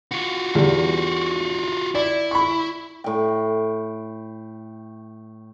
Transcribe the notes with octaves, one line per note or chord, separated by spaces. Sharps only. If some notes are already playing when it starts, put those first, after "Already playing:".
F4 F#4
E2 G3
E4 D5
B5 C#6
A2 G5